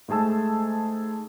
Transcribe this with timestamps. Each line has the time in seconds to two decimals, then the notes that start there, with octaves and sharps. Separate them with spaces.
0.08 G#2 A3 G#4 A5 E6